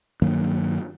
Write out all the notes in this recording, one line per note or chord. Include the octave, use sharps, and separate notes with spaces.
G2 D#3 F#3 A#3